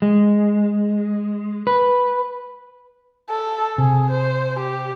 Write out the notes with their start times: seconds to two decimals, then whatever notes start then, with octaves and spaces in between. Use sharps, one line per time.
0.02 G#3
1.67 B4
3.30 A4
3.78 C3 G#4
4.11 C5
4.59 G4